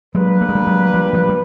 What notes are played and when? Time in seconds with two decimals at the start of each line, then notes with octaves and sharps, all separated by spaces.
0.14 F#3 G#3 A#3 D4 G4 B4
0.41 A3
0.49 G#3
0.55 G3 A3
0.67 F#3 G#3
0.94 F3 G3
1.13 F3 G3
1.29 G3